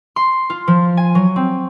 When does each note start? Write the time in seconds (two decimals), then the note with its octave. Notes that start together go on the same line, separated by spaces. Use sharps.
0.16 C6
0.50 F4
0.68 F3
0.97 G#5
1.15 F#3
1.36 C4